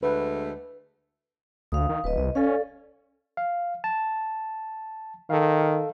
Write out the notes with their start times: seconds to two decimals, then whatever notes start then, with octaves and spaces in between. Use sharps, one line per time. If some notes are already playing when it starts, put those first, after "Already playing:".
0.03 D2 G#3 A3 B4
1.72 D2 F5 D#6
1.89 D#3
2.04 D1 B4 D#5
2.17 C2 D#5
2.35 C#4 A4 D5 F5
3.37 F5
3.84 A5
5.30 D#3 A4 F5